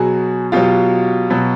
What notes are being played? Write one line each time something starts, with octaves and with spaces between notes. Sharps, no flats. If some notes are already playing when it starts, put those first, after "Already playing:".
Already playing: B2 F#3 F#4 G#4
B2 F#3 F4 G4
B2 F#3